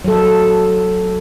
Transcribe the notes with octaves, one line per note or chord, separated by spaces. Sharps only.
F#3 A4